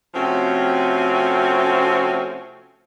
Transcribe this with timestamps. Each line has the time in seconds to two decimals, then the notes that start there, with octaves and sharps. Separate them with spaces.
0.14 C3 F3 A3 C4 C#4 F#4